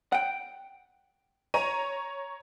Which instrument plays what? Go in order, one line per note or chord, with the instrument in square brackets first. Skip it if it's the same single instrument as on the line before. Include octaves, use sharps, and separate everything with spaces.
[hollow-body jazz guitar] F#5 G5
[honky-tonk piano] C#5 A#5 D#7